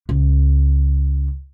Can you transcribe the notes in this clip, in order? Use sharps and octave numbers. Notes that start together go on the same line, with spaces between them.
C#2